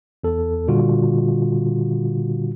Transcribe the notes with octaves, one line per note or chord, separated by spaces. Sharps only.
E2 A4
A#2 D3 G3 F4 F#4